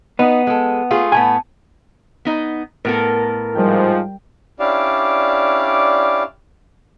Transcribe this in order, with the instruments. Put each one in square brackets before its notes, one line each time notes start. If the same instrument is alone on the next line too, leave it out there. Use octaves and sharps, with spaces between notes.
[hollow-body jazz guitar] B3 B4 [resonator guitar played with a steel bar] D#4
[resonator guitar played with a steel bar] G#3 A4
A3 F4 G#4
[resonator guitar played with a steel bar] A2 A3 B3 [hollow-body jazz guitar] G#5
[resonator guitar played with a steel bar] B3 D#4 D#5
[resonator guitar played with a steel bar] A2 B3 A4 [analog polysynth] A#4
[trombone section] G#2 F3 [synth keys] G3 G5
[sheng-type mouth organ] C#4 D4 E4 G4 D5 F5